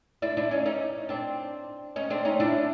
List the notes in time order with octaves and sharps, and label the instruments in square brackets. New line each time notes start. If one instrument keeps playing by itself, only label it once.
[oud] D4 E4
D4 E4
C#4 D#4
C#4 D#4
C4 D4
C#4 D#4
C4 D4
C#4 D#4
D4 E4